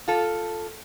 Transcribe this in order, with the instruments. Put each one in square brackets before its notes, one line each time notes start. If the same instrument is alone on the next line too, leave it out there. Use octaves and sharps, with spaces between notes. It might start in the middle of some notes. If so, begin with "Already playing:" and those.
[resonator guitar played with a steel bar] F4 A4